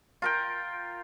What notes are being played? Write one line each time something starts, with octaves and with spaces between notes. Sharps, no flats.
F4 A#4 G5